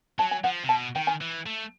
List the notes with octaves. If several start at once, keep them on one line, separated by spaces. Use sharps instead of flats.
F#3 A5
G#5
F3 F#5
C3
B2 A5
D#3 G5
G#5
E3
A3